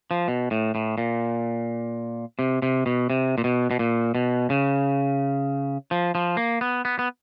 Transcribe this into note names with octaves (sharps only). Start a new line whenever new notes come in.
F3
B2
A2
A2
A#2
C3
C3
B2
C3
A#2
B2
B2
A#2
B2
C#3
F3
F3
A#3
B3
B3
B3